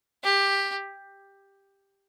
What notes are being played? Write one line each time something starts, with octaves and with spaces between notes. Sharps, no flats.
G4